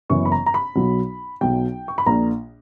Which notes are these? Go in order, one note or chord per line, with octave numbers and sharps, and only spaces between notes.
F#1 F#2 E3 B3 C#6
B5
A#5
A#5
B5
B1 B2 F#3
B1 B2 F#3 G5
C#6
B5
A#1 A#2 A#3 D4 A#5